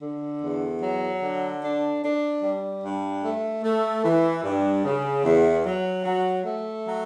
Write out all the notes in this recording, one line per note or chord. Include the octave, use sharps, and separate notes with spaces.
D3
E2
F#3
D3
D4
D4
G3
G2
A3
A3
E3
G2
C#3
E2
F#3
F#3
A3
F#3